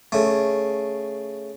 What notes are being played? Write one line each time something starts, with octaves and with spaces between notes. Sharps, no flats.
C#3 A3